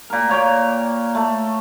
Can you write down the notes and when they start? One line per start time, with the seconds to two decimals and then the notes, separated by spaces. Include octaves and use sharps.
0.10 A#2 A#4
0.29 A#3 C#5 G5
1.15 A3